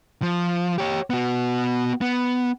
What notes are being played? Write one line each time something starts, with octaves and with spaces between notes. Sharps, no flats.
F3
G4 C#5
B3 F#4
B3